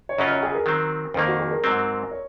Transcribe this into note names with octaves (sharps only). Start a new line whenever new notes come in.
C#5
F#2 C#3 F#3 C#4 F4 D#5
C#5
G#4
A#4
D#3 F#3 C4
F2 D#3 A#3 C5
F#4
G#4
A#4
G#2 F#3 C4
C#5